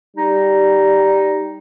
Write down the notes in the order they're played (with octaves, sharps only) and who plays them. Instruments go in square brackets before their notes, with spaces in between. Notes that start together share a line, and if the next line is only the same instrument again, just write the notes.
[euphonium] G3 [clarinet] D#4